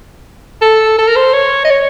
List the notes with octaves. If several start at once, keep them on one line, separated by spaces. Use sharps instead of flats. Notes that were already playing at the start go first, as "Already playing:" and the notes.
A4
A4
A#4
C5
C#5
D#5
C#5